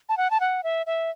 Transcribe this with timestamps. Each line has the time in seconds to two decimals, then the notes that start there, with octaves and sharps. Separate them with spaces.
0.09 A5
0.17 F#5
0.31 A5
0.40 F#5
0.63 E5
0.86 E5